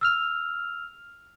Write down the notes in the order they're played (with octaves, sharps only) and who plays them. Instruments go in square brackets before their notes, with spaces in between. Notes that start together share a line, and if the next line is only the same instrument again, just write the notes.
[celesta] E6 F6 F7